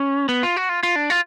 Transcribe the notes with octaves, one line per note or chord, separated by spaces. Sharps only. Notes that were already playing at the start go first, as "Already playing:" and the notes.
Already playing: C#4
B3
F4
F#4
F4
F4
D4
F4